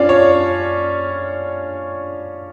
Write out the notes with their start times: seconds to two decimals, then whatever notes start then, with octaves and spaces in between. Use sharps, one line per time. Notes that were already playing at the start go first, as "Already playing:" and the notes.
Already playing: C#4 D4 F4 D5
0.09 C#5